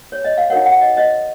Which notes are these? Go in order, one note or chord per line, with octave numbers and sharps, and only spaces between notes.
C#5
D#5
F5
D#4 F#4 A#4 C#5 F#5
F#5
D#5
D#5